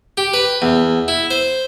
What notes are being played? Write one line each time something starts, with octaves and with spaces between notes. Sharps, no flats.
G4
B4
E2
E4
C5